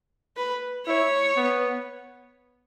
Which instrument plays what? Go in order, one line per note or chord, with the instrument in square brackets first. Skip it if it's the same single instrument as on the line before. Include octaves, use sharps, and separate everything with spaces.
[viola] B4
[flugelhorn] E4 [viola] C#5
[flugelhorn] B3